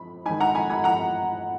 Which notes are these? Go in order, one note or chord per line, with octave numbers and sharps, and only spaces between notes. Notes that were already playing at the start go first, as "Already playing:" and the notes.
Already playing: F2 B5
D#3 G#3 D#4 G#5 B5
F#5 A#5
G#5 B5
G#5 B5
F#5 A#5